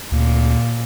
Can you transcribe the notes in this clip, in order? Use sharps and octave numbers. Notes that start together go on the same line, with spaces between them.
D2 A#2